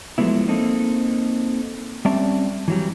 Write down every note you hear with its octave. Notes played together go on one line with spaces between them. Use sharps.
F3 F#3 G#3 A3 B3 E4
A#3 C4 D#4 A4
G3 C4 C#4 D5 E5 A5
E3 F#3 G3